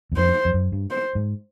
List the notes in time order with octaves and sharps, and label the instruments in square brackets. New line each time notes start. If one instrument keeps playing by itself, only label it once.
[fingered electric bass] E2
[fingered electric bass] F2 [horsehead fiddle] C5
[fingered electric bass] F2
F#2
G2
[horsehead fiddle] C5
[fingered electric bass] G#2